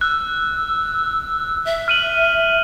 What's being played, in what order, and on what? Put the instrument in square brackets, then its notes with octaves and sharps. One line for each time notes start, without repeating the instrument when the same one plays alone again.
[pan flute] E6 [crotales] F#6
[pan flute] E5
[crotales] F6 D#7 F#7